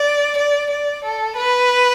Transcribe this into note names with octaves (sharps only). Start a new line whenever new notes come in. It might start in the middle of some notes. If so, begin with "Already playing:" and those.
Already playing: D5
D5
D5
A4
B4